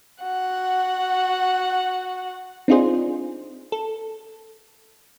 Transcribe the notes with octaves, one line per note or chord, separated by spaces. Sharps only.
F#4 F#5
C4 D4 D#4 F4 G#4 C5
A4